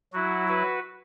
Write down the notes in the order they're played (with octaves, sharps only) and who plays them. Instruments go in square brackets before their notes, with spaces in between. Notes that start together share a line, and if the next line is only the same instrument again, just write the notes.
[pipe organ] F#3 E4 F#4
F#4 B4